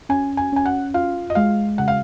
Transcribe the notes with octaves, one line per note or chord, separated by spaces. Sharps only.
C#4 G#5
G#5
C#4 G#5
F#5
F4 F5
D#5
G#3 F5
C#3 F#5
F5